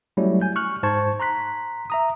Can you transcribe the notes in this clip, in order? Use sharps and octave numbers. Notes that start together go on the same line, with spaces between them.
F#3 G3 A3 C#4 E4 C#5
G#5 G6
C#6 F6 F#6
G#2 C5 A5 C#6 G#6
A#5 C6 F#6 B6
E5 A#5 D#6